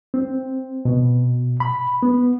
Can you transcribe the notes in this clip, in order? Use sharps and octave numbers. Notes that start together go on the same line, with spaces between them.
C4
B2
B5
B3